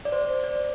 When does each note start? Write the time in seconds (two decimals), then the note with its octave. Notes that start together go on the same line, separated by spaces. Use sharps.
0.05 D5
0.12 C5
0.43 D5